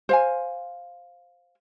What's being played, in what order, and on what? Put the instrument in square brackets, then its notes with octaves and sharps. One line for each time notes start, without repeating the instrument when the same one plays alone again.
[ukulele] C5 F5 G#5